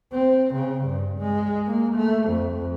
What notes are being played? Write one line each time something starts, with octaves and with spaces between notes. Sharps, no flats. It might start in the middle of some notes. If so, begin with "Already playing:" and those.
C4
C#3
G2
G#3
A#3
A3
F2